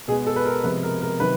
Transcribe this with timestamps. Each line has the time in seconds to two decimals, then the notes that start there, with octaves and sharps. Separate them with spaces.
0.08 B2 G#3 B3 G#4
0.27 A4
0.36 B4
0.45 A#4
0.64 C3 F3 G#3 B3 B4
0.83 A#4
1.02 A#4
1.20 C3 D#3 F#3 B4